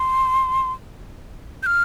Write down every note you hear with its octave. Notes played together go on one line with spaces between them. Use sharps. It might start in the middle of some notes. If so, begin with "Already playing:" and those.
Already playing: C6
G6
F6